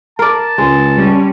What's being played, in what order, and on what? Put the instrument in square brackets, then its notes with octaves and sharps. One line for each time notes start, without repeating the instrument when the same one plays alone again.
[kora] A#4 D5 [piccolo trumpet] A5
[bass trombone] C#2 [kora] G#3
[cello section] G3 C#4